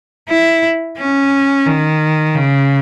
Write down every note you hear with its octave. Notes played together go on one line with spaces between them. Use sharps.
E4
C#4
D#3
C#3